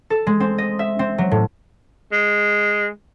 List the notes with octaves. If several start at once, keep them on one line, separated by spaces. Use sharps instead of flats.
A4
G#3
C4
D#5
E5
C4
F#3
A2
G#3